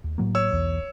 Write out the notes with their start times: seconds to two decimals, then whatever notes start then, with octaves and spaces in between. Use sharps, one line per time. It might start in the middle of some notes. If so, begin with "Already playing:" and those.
0.04 D#2
0.18 A2 F#3 A#3
0.35 C#5 E6
0.52 B1 E2